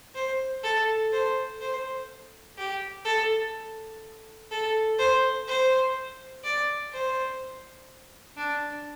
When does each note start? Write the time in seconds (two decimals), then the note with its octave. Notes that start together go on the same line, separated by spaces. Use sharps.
0.15 C5
0.64 A4
1.13 C5
1.61 C5
2.58 G4
3.05 A4
4.51 A4
4.99 C5
5.48 C5
6.44 D5
6.93 C5
8.37 D4